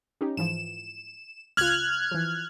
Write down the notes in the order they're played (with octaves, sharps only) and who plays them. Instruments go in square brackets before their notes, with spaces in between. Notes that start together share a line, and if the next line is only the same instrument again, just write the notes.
[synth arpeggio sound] C#4 D#4 G4
[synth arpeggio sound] G#2 E3 F3 [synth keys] E7
[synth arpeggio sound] C#2 F4 [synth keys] F6 F#6 G#6
[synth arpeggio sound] E3 F3